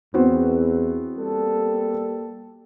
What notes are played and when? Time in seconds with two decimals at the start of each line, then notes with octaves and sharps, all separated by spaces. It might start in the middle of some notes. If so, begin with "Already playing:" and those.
0.14 E2 B3 C4 F#4
1.18 G3 A#3 A4